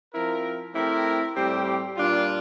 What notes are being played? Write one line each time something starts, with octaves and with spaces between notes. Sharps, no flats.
F3 C4 E4 A#4
A3 C4 E4 G4 A#4
A2 G3 C4 G4
A#2 G3 D4 F4